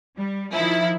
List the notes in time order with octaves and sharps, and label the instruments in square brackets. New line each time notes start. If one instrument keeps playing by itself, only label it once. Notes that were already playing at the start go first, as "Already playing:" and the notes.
[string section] G3
D#3 F3 E4